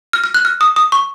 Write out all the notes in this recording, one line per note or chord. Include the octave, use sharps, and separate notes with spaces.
F6
F6
F#6
F6
D#6
D#6
C#6